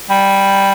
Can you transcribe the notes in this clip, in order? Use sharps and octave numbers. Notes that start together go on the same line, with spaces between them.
G3